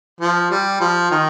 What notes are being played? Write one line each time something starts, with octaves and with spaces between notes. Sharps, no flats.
F3
G3
F3
D#3